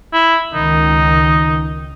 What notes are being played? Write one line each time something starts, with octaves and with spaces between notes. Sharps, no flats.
E4
C#2 D#3 D#4